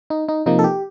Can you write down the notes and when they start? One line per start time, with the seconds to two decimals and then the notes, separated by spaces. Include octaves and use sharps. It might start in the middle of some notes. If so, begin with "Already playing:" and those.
0.10 D#4
0.29 D#4
0.46 C3 F3 A#3 D#4
0.59 A4
0.64 G4